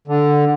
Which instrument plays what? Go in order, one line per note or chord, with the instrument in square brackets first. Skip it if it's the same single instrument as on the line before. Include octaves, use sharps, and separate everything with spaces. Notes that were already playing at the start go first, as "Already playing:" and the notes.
[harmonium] D3